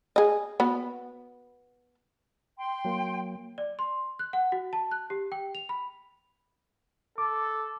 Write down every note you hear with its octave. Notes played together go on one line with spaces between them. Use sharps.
G#4 D#5
B3 F#4
G5 C6
F#3 A#3
D5
C6
F#6
F#5
F#4
A5
F#6
G4
G5
F7
B5
A4 D6